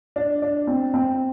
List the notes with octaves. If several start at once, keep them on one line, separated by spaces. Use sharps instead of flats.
D4
D4
C4
C4